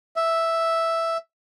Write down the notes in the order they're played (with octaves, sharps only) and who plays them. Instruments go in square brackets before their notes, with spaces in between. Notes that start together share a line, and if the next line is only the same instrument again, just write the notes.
[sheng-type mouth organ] E5